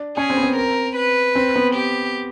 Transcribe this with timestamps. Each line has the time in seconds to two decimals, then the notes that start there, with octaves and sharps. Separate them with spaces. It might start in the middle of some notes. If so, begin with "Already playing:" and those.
Already playing: D4
0.17 C#4 G#4
0.30 C4
0.37 B3
0.43 C4
0.56 A#4
0.96 B4
1.35 C4
1.56 B3
1.75 G4